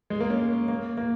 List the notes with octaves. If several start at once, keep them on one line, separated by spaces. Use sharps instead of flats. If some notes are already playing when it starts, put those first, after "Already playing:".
G#3
A#3
C#4
A#3
A#3